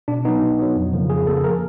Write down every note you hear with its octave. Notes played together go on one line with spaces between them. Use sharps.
B2 D4
F#3 B3 D#4
B2
F#3 B3
F2
C#3 F3 A#3
F2 G#4
C#3 F3 A#3 A4
A#4